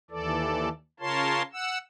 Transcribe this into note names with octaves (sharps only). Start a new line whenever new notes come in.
D#2 E3 A4 D5
C#3 F4 A#4 C#5 A5 C6
F#5 E6